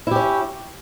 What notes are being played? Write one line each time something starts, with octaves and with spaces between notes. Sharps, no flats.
C#4 E4 G4